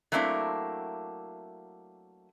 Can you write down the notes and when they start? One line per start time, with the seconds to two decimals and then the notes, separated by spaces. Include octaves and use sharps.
0.12 F#3 A3 A#3 C4 D4 E4